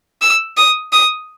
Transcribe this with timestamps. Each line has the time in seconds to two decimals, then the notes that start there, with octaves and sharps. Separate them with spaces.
0.22 E6
0.58 D#6
0.93 D#6